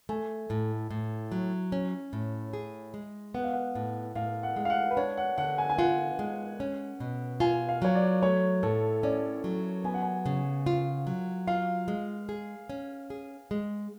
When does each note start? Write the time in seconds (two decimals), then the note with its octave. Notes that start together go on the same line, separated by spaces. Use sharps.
0.09 A3 G#5
0.50 A2
0.91 A2
1.32 F#3
1.72 C#4
2.13 A2
2.53 G#4
2.94 G#3
3.34 B3 F#5
3.44 F5
3.53 F#5
3.75 A2
4.15 A2 F5
4.43 F#5
4.56 G#3
4.65 F5
4.70 F#5
4.91 B4
4.97 D4 C#5
5.17 F#5
5.38 D3 F#5
5.58 G#5
5.70 G#5
5.78 F4 F#5
6.19 G#3
6.60 C#4
7.00 B2
7.40 F4 G#5
7.69 F5
7.82 F#3 C#5
7.95 D5
8.23 A3 C#5
8.63 A2 A4
9.03 C#4 D5
9.44 F#3
9.84 B3 G#5
9.94 F#5
10.02 G#5
10.26 C#3
10.66 F4
11.07 F#3
11.47 F4 F5
11.88 G#3
12.29 G#4
12.69 C#4
13.10 G#4
13.51 G#3